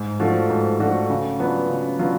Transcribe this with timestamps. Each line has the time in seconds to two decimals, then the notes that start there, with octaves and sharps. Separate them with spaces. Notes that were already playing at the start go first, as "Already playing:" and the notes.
Already playing: G#2
0.20 F3 A3 D4 F#4
0.50 G#2
0.80 F3 A3 D4 F#4
1.09 C#3
1.40 F#3 B3 D4 F4
1.69 C#3
1.99 F#3 B3 D4 F4